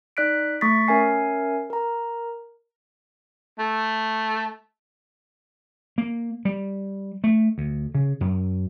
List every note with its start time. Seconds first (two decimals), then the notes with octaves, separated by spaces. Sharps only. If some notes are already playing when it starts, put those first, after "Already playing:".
0.17 D#4 D5 F#6 B6 D7
0.61 A3 C#6 D#6 A6 B6
0.88 C#4 A#4 E5 G#5 C7
1.70 A#4 A#5
3.59 A3
5.98 A#3
6.45 G3
7.24 A3
7.58 D2
7.95 C#3
8.21 F#2